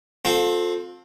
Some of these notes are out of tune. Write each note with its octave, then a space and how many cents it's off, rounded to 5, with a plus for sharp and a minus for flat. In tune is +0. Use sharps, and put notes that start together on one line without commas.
C4 +0 F4 +35 A4 +0